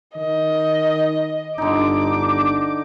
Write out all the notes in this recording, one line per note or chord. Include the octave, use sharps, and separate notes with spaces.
D#3 D#5
G1 D3 D#4 D6